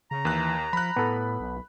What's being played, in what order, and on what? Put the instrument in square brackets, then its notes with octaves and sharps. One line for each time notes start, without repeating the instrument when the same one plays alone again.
[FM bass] C#3 [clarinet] A#5
[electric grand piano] D#2 F#6 [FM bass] E3
[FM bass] F3 [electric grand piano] B5 F#6
[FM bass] A2 [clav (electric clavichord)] B3 A4
[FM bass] B1